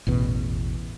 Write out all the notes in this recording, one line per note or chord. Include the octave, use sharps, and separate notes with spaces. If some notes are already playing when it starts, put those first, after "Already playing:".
A1 E2 B2